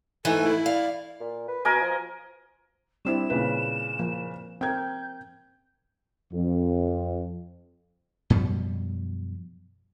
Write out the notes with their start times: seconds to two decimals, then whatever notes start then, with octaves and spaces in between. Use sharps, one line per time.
0.25 G#2 E3 A3 A4 G#5
0.46 E4
0.66 D5 F5
1.20 A#2
1.48 B4
1.65 B2 A#4 D#5 G#5
1.81 F3
3.05 G3 C4 D4 E4 E7
3.30 A#2 C#3 B4
3.99 F3 A#3
4.61 C4 A#4 G5 G6 G#6
6.33 F2
8.30 F#2 B2 F3 G3